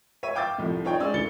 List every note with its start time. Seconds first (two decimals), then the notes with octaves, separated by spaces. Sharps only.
0.23 C#5 E5 D#7
0.35 F5 G5 D6 E6 G6 A6
0.58 C2 A2 F3
0.84 D#4 F4 C#5 D5 G5
1.00 G#3 C#4 C5 D5 E6
1.14 D2 E4 A6 C#7 G7